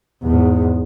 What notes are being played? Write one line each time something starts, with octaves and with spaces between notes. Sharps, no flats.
E2 G#2